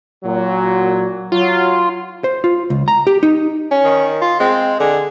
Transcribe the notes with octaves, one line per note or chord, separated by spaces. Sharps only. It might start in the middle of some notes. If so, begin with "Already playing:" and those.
A#2 F#3
F#3 F4
C5
F4
C#2
A#5
G4
D#4
C#4
D#3
F4
G#3 C4
D3 G#4